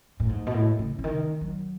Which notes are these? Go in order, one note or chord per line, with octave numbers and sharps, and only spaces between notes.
A2
G#2
B2
A2
C#3
C#3
D#3
F#3